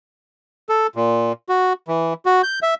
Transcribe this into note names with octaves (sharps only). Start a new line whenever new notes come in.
A4
A#2
F#4
E3
F#4
G6
E5